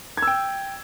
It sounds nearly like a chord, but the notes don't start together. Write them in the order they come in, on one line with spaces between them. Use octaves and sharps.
G#6 E6 G5